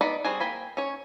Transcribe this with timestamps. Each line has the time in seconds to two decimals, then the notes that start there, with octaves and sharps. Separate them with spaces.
0.01 B3 D#4 B4 D5 B5
0.25 G3 C4 F#4 G#4 G#5
0.40 A#3 G5 G#5 B5
0.77 C#4 C#5